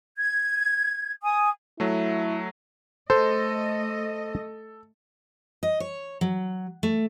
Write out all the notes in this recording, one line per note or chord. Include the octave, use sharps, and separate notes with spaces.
G#6
G#5 D#6
F#3 A3 E4
A3 A4 C5 D#5
D#5
C#5
F#3
A3